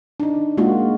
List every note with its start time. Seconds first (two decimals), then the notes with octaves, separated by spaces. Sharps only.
0.20 D4 D#4
0.57 G#3 A#3 F4 F#4